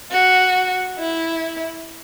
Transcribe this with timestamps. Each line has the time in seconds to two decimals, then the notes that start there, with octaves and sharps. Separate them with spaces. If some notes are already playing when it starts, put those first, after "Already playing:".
0.12 F#4
0.99 E4